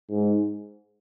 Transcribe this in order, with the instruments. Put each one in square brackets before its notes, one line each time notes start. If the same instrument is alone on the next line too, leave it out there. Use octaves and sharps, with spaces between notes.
[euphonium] G#2